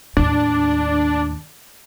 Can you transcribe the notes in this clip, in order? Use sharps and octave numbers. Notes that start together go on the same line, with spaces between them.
D#2 A2 D4